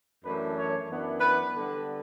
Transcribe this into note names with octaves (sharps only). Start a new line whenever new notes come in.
F#2 E3 A3 D4 B4
C#5
F#2 E3 B3 D4
B4
D3 G3 B3 D4